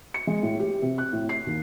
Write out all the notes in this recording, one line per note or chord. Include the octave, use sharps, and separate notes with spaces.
C#7
G#3
A2
G4
C3
F#6
A2
C7
D#2